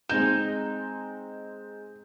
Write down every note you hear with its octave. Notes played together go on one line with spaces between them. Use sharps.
G#3 C4 D#4 G6 E7